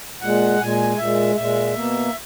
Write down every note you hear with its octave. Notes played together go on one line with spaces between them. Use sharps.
A#2 G#3 F#5
A#2 G#3 G#5
A#2 G#3 E5
A#2 G#3 E5
B2 A#3